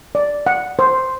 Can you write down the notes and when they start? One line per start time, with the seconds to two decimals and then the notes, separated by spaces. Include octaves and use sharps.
0.15 D5
0.47 F#5
0.79 C5